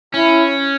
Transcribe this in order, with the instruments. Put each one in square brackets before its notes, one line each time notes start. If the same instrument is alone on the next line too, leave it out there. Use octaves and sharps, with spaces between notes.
[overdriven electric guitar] C#4 [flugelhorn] E4